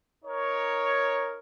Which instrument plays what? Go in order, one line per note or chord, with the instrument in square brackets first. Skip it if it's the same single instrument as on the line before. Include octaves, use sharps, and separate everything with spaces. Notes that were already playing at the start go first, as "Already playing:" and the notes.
[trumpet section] D#4 A#4 C#5